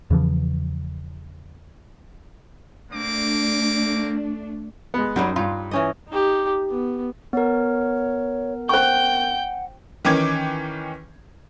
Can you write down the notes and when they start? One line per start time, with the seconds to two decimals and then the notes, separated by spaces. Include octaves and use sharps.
0.10 E2 C#3 E3 F3
2.90 A3 A#3 C4 D4 D6
4.94 G#3 B3
5.16 F#2 F#3 G3 C#4 D#4
5.36 G2 F4
5.71 E3 C#4 D#5
6.09 D#4 G4
6.70 B3
7.33 B3 A#4 C#5
8.69 C5 F#5 G5 C#6 G6
10.05 D#3 E3 C#4 G5 D6 G#6